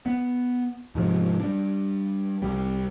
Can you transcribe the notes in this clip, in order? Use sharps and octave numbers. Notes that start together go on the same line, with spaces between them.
B3
G#2 C3 F3 G#3
G3 D4
C2 G3